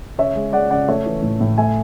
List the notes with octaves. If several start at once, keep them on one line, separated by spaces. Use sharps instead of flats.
C#3 C#5 E5
G#3
G#3 D5 F#5
C#3 D5 F#5
A3 C#5 E5
E3
A2
A2
A3 E5 G#5